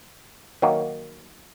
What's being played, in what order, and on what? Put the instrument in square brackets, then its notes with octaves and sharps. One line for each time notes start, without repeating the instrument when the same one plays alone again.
[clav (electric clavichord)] D#3 F#3 A#3 D#4